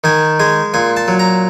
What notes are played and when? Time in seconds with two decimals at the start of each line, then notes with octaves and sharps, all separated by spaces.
0.04 D#3 G#5
0.40 G#3 G#5
0.74 A#2 G#5
0.97 A5
1.08 F#3
1.19 A#5